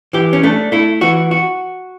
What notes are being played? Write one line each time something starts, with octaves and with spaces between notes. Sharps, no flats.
E3 G4
C#4
A3 D4
A3 E4
E3 F#4
F#4